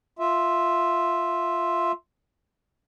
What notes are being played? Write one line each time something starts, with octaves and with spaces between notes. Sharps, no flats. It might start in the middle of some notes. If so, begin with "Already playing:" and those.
F4 E5